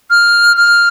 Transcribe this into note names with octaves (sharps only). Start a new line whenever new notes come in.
F6
F6